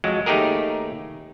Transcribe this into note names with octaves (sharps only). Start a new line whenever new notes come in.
F2 F#3 G#3
D#2 A3 D#4 G4 G#4 A#4